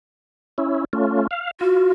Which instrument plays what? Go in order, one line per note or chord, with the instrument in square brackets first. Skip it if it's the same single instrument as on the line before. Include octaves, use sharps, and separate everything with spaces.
[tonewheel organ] C#4 E4
A3 C#4 F4
F5
[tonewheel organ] F4 [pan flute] F#4